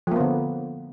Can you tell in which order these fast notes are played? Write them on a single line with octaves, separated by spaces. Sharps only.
F3 A#3 B3 D3